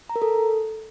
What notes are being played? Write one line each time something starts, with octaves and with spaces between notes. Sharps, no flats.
A#5
A#4
A4